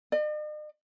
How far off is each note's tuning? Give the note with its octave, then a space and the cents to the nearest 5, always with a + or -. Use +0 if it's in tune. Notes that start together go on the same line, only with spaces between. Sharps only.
D#5 -45